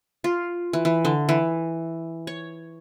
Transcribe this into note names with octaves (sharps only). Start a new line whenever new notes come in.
F4
E3
E3
D3
E3
C#5